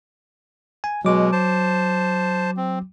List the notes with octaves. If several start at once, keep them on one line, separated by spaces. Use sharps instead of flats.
G#5
B2 F#3 G#3 D6
C5 A5
C4